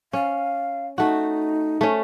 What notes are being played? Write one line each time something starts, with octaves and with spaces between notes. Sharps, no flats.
C#4 F5
A3 D#4 F#4
A3 C#4